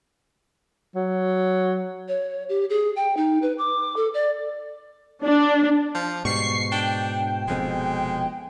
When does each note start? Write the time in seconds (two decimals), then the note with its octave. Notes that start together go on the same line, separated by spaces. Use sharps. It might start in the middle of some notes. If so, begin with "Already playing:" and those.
0.95 F#3
2.08 C#5
2.49 G4
2.70 G#4
2.96 G5
3.17 D#4
3.42 B4
3.58 D6
3.96 A4
4.14 D5
5.25 D4
5.95 F3
6.25 G#2 B2 G3 C#6 C7
6.72 D4 G5
7.48 F1 F2 B2 G#3